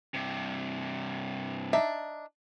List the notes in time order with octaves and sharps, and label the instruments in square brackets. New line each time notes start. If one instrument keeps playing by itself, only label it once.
[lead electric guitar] G2 C3
[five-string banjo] D4 D#4 E5